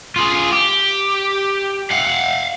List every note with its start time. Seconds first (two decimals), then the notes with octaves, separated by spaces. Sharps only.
0.16 F4 G#4
0.52 G4
1.91 F5 F#5